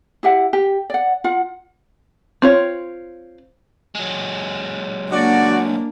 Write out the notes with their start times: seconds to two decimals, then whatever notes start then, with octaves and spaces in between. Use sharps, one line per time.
0.23 E4 G4 E5 F#5
0.53 G4
0.90 D5 F#5
1.24 F4 F#5
2.42 C4 F4 C#5
3.95 F#3 G#3
5.12 A#3 D4 F#4 D5